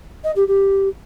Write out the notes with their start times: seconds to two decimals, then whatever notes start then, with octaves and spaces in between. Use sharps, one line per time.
0.24 D#5
0.36 G4
0.47 G4